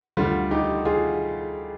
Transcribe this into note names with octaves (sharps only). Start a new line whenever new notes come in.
D2 D3 G3 F4
D#4 G4
F4 G#4